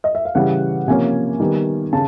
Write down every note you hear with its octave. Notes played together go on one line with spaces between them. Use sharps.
D#5
E5
F5
C#3 E3 G3 F#5
C3 F3 A#3 C#4 G#5
D#3 G3 B3
C#3 A5